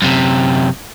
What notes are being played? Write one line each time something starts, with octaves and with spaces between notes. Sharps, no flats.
F#2 C3